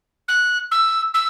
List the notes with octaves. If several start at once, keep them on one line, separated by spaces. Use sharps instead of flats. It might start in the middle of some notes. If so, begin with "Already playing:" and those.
F#6
E6
E6